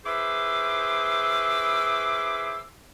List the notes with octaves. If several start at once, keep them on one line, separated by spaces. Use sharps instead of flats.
E4 G#4 B4 C5 D6 E6